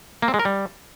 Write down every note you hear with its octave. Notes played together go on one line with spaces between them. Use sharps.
A#3
C4
G#3
A#4
G3